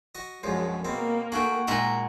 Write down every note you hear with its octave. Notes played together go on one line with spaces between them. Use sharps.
F#4 D#5
A#1 F#2 F3 F#3 G#3
B2 A#3 C4
A3 F#4 G#4 G5
A#2 G#3 A#4 E5 C6 D#6